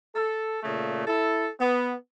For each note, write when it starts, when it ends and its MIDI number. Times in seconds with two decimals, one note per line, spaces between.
0.15 0.61 69
0.63 1.07 46
0.63 1.07 49
0.63 1.07 57
1.07 1.48 64
1.07 1.48 69
1.60 1.94 59